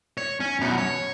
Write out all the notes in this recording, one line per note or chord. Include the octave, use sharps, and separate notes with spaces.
C#5
C#4
F#2 B2
C#5